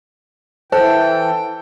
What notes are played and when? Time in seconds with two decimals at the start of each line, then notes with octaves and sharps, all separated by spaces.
0.72 E3 A4 C5 G5